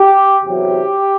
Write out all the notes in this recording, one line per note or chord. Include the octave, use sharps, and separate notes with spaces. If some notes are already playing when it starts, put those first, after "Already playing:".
Already playing: G4
E2 C3 F#3 G4